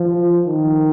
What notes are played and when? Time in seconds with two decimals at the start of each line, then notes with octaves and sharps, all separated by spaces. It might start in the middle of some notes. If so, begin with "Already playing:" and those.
Already playing: F3
0.47 D#3